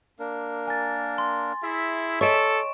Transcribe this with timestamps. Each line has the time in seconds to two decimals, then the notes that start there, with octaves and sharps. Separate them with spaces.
0.19 A#3 D4 A#4
0.67 G#5 A6
1.18 C6
1.63 E4 G#4 E5
2.21 A4 C#5 D#5 C#6 D7 E7